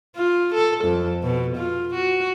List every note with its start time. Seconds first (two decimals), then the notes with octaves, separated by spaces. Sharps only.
0.16 F4
0.54 A4
0.85 F2
1.23 B2
1.56 F4
1.95 F#4